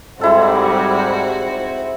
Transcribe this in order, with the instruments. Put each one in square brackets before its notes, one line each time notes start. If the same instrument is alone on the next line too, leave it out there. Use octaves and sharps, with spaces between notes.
[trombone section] G#2 G3 [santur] G#3 E4 A4 [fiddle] C4 F#4